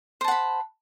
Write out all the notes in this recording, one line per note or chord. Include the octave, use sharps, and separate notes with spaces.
C5 F#5 A5 B5